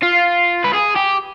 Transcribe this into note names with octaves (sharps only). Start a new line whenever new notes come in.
F4
B4
G#4
G4